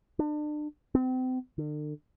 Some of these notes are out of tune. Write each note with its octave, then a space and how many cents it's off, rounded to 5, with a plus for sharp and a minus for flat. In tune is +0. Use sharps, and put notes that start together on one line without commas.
D4 +35
C4 -35
D3 +40